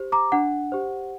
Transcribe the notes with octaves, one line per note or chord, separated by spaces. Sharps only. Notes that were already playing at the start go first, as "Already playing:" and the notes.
Already playing: G4 C5
A#5 D6
D4 F#5
G4 C5